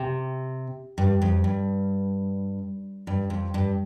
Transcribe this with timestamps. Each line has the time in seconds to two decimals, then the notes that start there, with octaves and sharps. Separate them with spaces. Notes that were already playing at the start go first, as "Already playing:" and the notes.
Already playing: C3
0.98 G2
1.22 F2
1.44 G2
3.07 G2
3.30 F2
3.54 G2